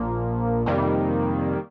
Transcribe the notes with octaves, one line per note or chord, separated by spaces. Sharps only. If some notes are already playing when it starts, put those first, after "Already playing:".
Already playing: A#1 A#2 F3 A#3
F2 C3 D#3 G3 A#3